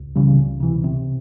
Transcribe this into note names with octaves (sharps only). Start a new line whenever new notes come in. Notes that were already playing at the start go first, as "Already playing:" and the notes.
Already playing: C#2
C#3 E3 G3
C#2
C3 E3
C3